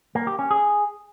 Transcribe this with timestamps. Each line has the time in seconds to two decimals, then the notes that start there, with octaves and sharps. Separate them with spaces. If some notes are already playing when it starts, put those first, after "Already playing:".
0.15 A#3
0.27 G4
0.39 C#4
0.51 G#4